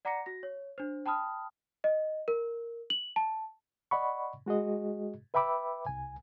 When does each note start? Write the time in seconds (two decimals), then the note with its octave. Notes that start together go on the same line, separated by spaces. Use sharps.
0.05 D5 F#5 A#5 D6 A#6 C#7
0.26 F#4 A#6
0.43 C#5
0.78 D4 C5
1.06 G5 A5 B5 D#6 F6
1.84 D#5
2.28 A#4
2.90 F#7
3.16 A5
3.91 D5 D#5 F#5 B5 C#6
4.46 G#3 F#4 G#4 D#5
5.34 B4 E5 G5 B5 D6 E6
5.86 C2 G#5